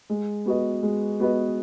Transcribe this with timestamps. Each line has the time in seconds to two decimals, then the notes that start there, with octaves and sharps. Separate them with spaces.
0.10 G#3
0.46 B3 F#4 B4 D#5
0.83 G#3
1.20 B3 F#4 B4 D#5